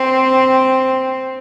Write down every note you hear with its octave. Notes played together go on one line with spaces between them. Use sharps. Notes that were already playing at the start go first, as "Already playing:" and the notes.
Already playing: C4